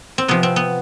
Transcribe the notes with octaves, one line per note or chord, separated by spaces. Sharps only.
C4
C3 F3 B3
C4
B3